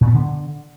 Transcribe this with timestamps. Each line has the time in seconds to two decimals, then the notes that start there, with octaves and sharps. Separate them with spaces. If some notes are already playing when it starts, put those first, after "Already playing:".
0.01 A#2
0.07 B3
0.14 D3